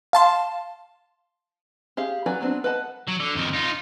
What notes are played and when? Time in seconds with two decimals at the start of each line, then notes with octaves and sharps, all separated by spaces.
0.13 F5 A5 C6
1.97 G4 G#4 F5
2.26 F#3 F#4 B4 D5 G#5
2.41 F#3 B3 C4 D4
2.64 B4 D#5 F#5 A5
3.08 F#3
3.20 D3
3.35 F2 D#3
3.54 D#4 F4